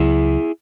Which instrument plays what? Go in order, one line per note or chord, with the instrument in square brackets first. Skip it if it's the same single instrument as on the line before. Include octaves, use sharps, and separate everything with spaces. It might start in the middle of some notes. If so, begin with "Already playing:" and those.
Already playing: [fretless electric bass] C#2 C#3 F#3 [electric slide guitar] E4 G#4